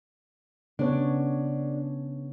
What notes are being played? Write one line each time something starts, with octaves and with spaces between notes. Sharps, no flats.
C#3 B3 D4 C#5